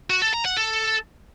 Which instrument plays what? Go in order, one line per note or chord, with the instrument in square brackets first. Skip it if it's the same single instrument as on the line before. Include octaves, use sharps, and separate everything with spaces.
[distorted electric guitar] F#4
A4
A#5
F#5
A4